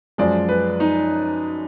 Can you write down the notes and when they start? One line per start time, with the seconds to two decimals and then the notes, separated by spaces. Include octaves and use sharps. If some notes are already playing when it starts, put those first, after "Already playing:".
0.18 F#2 F3 G#3 D5
0.49 B4
0.80 D#4